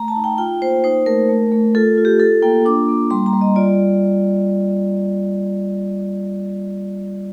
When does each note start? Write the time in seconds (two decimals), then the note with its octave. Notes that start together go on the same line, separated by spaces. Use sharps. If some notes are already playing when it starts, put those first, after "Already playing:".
Already playing: A3 A#5
0.08 A5
0.16 D#4
0.24 G5
0.38 F4 G5
0.61 A#3 C5
0.84 D#4 C5
1.06 A3 A#4
1.29 A3
1.52 A3
1.75 F4 A4
1.98 F4
2.05 G4
2.20 F4 A4
2.42 A#3 G5
2.65 D4 D6
2.88 A#3
3.11 G3 C6
3.26 A#5
3.33 G3
3.41 D#5
3.56 F4 D5